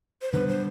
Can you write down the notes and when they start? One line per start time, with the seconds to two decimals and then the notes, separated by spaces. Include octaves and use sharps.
0.22 C5
0.32 D2 D3 G3 B3 B4
0.48 C5